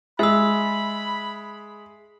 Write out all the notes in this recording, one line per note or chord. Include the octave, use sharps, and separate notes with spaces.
G#3 E5 B5 E6